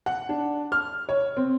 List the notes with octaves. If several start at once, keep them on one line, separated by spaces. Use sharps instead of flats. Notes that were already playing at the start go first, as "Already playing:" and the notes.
F#5
D4
F6
C#5
C4